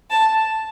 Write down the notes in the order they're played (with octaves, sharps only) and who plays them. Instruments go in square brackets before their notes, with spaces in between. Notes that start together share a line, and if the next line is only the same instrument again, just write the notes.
[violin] A5